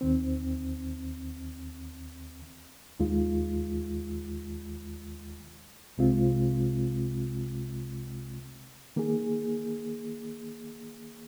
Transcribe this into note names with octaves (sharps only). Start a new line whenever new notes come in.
D#2 D#3 C4
D#2 D#3 G#3 F4
C2 C3 G#3 C4 F4
D#3 A#3 G#4